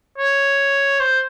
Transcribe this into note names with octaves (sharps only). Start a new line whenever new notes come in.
C#5
C5